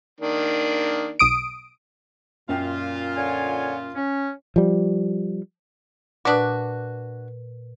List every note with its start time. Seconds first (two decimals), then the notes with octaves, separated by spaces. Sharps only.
0.21 D#3 A#3 D4
1.19 B1 D#6 D7
2.49 F#2 A#2 F4 G5 C7
3.17 D3 C#5 G#5
3.95 C#4
4.56 F3 G3
6.25 A#2 D4 F#4 B4 D#6